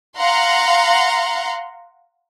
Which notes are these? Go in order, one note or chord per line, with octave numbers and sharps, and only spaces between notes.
F5 F#5 A#5 C6